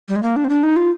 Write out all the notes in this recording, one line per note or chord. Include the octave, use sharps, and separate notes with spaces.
G3
G#3
A#3
D4
C4
D4
D#4
F4